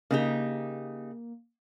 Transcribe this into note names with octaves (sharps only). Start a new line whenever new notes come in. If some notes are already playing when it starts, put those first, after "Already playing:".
C#3 A#3 D#4 G4